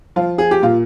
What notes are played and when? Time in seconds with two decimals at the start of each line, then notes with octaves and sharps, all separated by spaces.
0.16 F3 F4
0.38 G#4
0.51 G4
0.62 A#2 F4